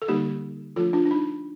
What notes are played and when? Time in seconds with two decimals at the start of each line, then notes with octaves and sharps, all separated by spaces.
0.02 A4
0.08 D3 G3 A#3 D#4 G4
0.76 F3 A3 D4 F4 A4
0.93 D4 F4
1.05 D4
1.11 D#4